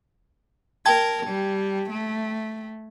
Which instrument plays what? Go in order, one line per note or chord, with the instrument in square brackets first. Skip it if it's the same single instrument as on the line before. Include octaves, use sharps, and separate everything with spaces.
[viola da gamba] A#4 [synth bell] G5 A5 G#6
[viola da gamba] G3
A3